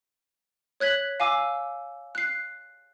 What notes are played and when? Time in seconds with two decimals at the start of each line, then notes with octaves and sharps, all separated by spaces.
0.80 C#5 F#6 G#6 B6 F#7
1.20 F5 G#5 D6 E6
2.15 F#6 C7